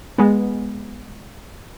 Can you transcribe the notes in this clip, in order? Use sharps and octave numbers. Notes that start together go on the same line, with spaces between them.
G#3 B3